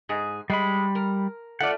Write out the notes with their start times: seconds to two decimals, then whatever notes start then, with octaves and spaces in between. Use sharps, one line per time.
0.09 G#2 G#4
0.50 G3 G#3 B5
0.95 A#4
1.61 A3 F4 D5 F#5